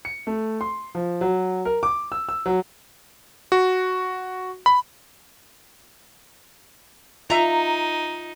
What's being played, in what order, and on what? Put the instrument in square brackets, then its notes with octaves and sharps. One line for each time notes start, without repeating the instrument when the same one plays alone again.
[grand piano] C#7
A3
C6
F3
F#3
A#4
D6
E6
E6
F#3
[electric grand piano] F#4
B5
[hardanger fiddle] D#4 [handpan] F4 [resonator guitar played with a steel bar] E5 A#5